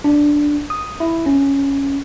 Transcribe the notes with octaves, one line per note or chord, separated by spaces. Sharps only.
D4
D#6
E4
C#4